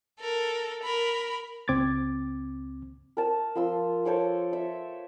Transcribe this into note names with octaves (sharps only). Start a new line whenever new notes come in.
A4 A#4
A#4 B5
C#2 C4 D6 G#6 A6
A#4 A5
F3 C6 E6
A4 C5 C#5 D6
E5